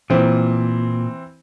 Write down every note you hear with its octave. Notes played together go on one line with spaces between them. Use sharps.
A#2 E3 C4